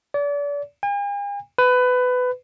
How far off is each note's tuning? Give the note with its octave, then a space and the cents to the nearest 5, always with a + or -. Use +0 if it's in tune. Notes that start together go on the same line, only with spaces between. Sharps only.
D5 -35
G#5 -45
B4 +20